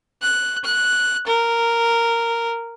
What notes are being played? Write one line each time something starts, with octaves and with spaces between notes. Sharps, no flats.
F#6
F#6
A#4